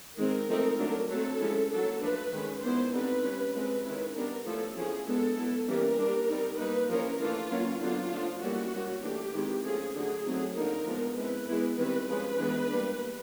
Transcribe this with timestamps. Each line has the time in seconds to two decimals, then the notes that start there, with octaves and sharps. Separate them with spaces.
0.19 D#3 G#3 C4 A#4
0.49 F3 A3 C4 D#4
0.79 D3 F#3 A3 D4
1.09 F#3 A3 C4 A4
1.40 F3 G#3 C#4 E4
1.71 F#3 A#3 D4 A4
2.02 F3 A3 D4 B4
2.32 D#3 G#3 C#4
2.62 D#3 G3 B3 E4 C5
2.93 D3 G3 C4 D#4 B4
3.23 G3 A#3 C#4
3.54 F3 G#3 C4 B4
3.85 D#3 G#3 C#4 E4
4.15 G3 B3 D4 A#4
4.46 F3 A3 C#4 E4 A4
4.76 F3 A3 C#4 E4 G#4
5.07 G#3 B3 D4 A4
5.38 F#3 B3 E4
5.68 E3 G3 A#3 C#4 A#4
5.98 G3 A#3 D4
6.29 G3 C4 D#4
6.59 G3 A#3 D#4 B4
6.90 F3 A#3 C#4 E4 A#4
7.20 E3 A3 D4 F4
7.51 F#3 A#3 C#4
7.81 D3 F#3 B3 D4 F4
8.12 D3 F3 A3 D4
8.42 G3 A#3 C#4 E4 F#4
8.73 G3 A#3 C#4
9.03 E3 A3 D4 G4
9.34 D#3 G#3 C4 E4
9.65 F3 A3 C#4 G#4
9.95 D3 F#3 A3 G#4
10.26 F#3 A3 C4 D#4
10.56 D3 F3 A#3 D#4 A#4
10.86 F3 G#3 B3 D4
11.17 G#3 C4 E4 B4
11.48 E3 G#3 B3 E4
11.78 D#3 G3 C4 E4 B4
12.09 F3 G#3 C#4 B4
12.39 E3 G#3 B3 D4
12.69 G3 A#3 D4